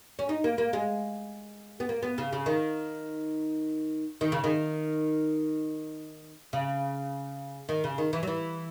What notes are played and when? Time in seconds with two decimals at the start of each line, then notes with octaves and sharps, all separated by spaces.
0.19 C#4
0.29 D#4
0.44 A#3
0.58 A#3
0.73 G#3
1.80 B3
1.89 A#3
2.02 B3
2.18 C#3
2.33 C#3
2.46 D#3
4.21 D#3
4.32 C#3
4.44 D#3
6.53 C#3
7.69 D#3
7.84 C#3
7.98 D#3
8.13 E3
8.23 F#3
8.27 E3